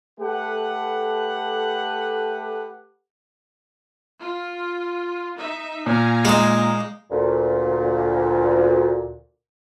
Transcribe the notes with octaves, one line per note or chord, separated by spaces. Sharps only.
A3 G4 A4 B4 F#5
F4
D#4 E5
A#2 F5 G#5 A#5
G#3 A#3 D#4
D2 A#2